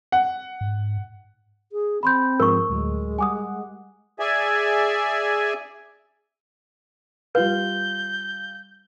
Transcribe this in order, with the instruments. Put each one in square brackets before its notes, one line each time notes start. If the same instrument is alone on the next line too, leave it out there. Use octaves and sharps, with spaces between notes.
[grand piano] F#5
[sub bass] G#2
[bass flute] G#4
[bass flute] C4 [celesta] B5 C6 G6
[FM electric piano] G#2 F3 G#3 [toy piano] A#4 C#6 [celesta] E6
[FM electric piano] D2 A2 F#3 [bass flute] G#3
[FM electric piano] G3 F#5 [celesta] G#5 D6 D#6
[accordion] G#4 D5 E5 G#5
[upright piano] G3 F4 F5 [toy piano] B4 [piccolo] G6